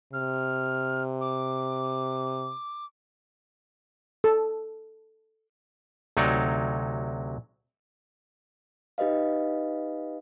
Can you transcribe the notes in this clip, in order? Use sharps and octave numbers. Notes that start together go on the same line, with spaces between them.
C3 F6
D6
A4
D2 C3 F#3 D#4 C#5 D5
D#4 G4 B4 D#5 F5